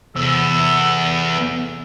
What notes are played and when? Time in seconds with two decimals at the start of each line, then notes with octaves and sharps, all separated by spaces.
0.16 E2 C3 A4